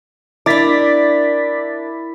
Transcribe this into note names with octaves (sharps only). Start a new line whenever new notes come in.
D4 E4 A#4 D6 A6 B6